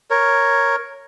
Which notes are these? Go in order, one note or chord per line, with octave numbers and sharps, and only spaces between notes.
A#4 C#5